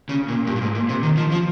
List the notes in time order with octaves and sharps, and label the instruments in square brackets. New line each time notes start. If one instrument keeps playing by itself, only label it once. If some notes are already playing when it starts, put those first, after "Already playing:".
[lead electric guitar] C#3
A#2
G2
A#2
G#2
A#2
C3
D#3
F3
F3